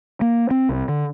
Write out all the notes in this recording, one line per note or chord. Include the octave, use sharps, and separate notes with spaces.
A#3
C4
C2
D3